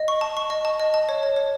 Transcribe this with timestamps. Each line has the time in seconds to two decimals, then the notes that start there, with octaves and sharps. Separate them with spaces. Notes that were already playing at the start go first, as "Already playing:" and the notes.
Already playing: D#5
0.08 C#6
0.21 A5
0.37 C#6
0.50 D#5
0.65 A5
0.80 D#5
0.94 A5
1.09 C#5
1.23 C#5
1.36 C#5